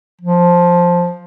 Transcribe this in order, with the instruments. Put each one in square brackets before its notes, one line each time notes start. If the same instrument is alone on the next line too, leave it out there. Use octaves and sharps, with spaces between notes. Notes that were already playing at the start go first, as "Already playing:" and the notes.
[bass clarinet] F3